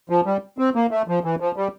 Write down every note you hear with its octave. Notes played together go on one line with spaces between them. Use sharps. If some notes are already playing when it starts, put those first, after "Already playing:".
F3
G3
C4
A#3
A3
F3
E3
F3
G3